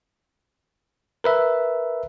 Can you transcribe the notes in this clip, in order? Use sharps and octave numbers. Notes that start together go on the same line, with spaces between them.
A#4 B4 E5